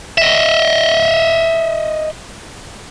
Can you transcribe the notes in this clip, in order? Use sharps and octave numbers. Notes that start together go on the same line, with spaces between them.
D#5 E5